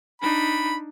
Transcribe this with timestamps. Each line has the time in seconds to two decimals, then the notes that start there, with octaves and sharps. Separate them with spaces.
0.22 D4 D#4 B5